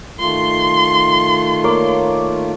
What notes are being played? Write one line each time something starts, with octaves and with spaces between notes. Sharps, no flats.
D#3 A3 F4 C6
A#3 C#5 D5